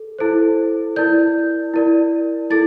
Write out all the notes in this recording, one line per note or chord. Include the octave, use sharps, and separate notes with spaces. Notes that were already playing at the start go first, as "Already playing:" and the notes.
Already playing: A4
E4 A4 C5
E4 A#4 D5 G6
E4 A#4 D5
E4 A4 A6